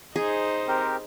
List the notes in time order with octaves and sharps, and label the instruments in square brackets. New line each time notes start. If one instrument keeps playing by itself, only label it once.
[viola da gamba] D#4 C5 [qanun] G#4
[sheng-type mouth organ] C4 G4 A#4